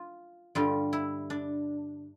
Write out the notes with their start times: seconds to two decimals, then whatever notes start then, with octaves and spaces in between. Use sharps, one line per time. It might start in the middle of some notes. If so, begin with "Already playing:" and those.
Already playing: F4
0.55 G2 D3 G3 F4
0.93 E4
1.30 D4